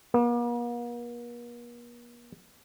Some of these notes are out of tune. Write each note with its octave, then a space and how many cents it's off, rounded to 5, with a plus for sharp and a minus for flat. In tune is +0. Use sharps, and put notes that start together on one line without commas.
A#3 +45